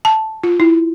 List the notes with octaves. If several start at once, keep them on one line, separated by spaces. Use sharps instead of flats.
A5
F4
E4